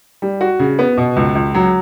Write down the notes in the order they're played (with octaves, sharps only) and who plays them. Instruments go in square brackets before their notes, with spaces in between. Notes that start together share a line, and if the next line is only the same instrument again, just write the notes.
[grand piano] G3
F#4
C#3
B3
B2
C#2
C#2
F#3